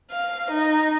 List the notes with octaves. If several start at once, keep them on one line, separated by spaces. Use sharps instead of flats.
F5
D#4